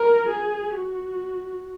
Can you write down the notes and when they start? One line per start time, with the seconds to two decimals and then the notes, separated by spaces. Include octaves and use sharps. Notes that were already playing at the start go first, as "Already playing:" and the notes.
Already playing: A#4
0.29 G#4
0.72 F#4